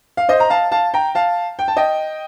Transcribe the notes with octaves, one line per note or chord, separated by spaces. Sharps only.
F5
C5 D#5
A#5
F5 A5
F5 A5
G5 A#5
F5 A5
G5
A5
D#5 G5